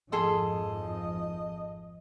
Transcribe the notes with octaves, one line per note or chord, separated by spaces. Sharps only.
G#1 F2 F3 G#4 A4 D#5 C6